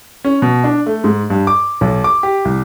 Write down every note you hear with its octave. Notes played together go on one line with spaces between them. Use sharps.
C#4
B2
D4
A3
G#2
G2
D6
B1
D6
G4
C2